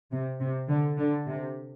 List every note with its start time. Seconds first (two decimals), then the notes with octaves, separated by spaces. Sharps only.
0.12 C3
0.41 C3
0.70 D3
0.99 D3
1.28 C3